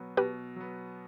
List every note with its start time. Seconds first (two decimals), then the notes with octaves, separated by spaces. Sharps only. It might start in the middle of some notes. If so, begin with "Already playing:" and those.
Already playing: B2 F#3 B3
0.17 B2 G4 B4
0.56 F#3 B3